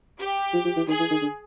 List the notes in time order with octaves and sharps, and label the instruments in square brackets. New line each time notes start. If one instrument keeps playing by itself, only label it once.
[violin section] G4
[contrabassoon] F3
F3
E3
[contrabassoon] D#3 [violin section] G#4
[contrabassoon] E3
D#3
D3